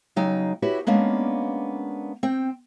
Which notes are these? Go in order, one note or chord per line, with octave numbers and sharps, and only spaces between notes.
C#3 F#3 D#4 G5
E4 F#4 G4 B4 C#5
G#3 A#3 B3 C#4 D4
C4 G5